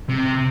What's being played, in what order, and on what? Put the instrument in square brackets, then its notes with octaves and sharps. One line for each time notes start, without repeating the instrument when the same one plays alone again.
[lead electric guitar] C3